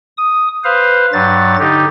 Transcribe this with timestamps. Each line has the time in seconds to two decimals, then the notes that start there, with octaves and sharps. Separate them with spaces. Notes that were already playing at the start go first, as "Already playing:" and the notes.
0.17 D#6
0.64 B4 C5 F5
1.13 G2 F#3 A6
1.59 D3 D#4 G4